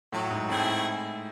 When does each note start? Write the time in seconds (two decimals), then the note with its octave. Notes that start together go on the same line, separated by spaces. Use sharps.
0.13 A2 F#3
0.31 G#2
0.49 A2 A3 C4 E4 G#4